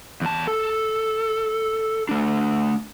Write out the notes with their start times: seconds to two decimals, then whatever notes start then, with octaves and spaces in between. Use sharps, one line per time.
0.21 E2 A5
0.48 A4
2.09 A3 D4